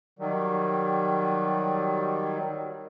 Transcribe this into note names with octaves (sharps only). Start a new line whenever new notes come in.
D#3 F#3 G3